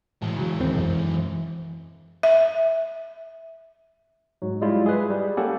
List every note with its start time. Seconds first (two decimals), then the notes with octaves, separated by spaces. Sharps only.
0.22 A2 E3 G#3
0.36 C#3 F#3
0.59 D#2 C4
0.74 B1 F#2
2.23 E5
4.42 G#2 F#3
4.61 G3 G#3 E4 F4
4.86 G#4 B4
5.10 G3
5.37 A#3 C#4 G4 A4 F#5